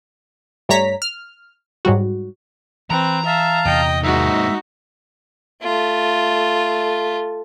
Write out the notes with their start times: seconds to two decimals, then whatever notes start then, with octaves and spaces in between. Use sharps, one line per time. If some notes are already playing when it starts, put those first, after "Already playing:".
0.69 G2 G3 A3 C#5 A#5 B6
1.02 F6
1.85 G#2 F#3 G3 F#4
2.90 E3 C4 B4 A#5
3.26 E5 F5 A5
3.65 E2 C3 E3 D#5 G5
4.04 D#2 G#2 D#4 F#4 E5
5.63 A3 F4